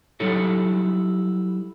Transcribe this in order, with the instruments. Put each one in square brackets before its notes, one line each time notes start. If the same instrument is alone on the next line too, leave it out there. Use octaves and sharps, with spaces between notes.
[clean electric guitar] F#3 G3 D#4 E4 A4 C#5